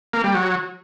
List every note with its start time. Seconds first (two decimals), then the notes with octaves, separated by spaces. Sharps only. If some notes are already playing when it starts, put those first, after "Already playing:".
0.13 A#3
0.24 G3
0.34 F#3